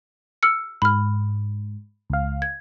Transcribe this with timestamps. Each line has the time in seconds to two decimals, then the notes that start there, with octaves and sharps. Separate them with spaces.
0.43 E6 F6 C#7
0.82 G#2 B5 F6
2.10 C#2 F5
2.42 G#6